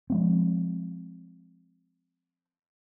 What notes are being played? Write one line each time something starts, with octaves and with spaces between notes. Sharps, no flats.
F3 G#3 C4